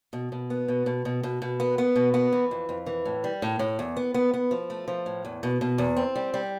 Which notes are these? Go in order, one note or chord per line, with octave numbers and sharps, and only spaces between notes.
B2
B2
B3
B2
B2
B2
B2
B2
B3
B3
B2
B3
E3
F2
F2
E3
A2
G3
A2
A2
E2
B3
B3
B3
F3
A3
F3
A2
E2
B2
B2
E2
C4
G3
G3